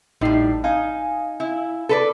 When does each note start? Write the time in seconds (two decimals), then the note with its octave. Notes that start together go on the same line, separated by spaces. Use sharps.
0.21 A1 A2 G3 D#4 C7
0.64 D#4 F5 G#5
1.40 E4
1.89 A4 B4 D5